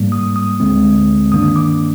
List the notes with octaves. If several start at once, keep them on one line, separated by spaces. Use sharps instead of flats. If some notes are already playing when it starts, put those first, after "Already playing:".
Already playing: G#2 G3 A#3
D#6
D#6
D2 D3 G#3 C4
G2 D#3 A#3 D4 D#6
D6